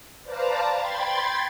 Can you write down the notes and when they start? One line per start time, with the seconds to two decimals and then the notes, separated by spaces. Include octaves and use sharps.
0.22 B4 C5 D5 F5 A5 A#5
0.76 G5 B5 C6 G#6 A6